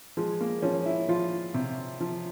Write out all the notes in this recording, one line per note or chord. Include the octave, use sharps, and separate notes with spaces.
F3 G#3
A#3
F3 C#4
E4
F3 F4
C3
F3